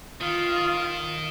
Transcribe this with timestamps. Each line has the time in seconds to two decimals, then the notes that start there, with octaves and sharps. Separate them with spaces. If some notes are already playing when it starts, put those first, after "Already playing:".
0.21 D#3 F4